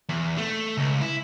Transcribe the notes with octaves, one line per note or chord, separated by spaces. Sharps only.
E2
A3
C#2
E4